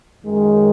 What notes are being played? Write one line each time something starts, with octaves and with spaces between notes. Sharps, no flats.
F#2 D#3 G#3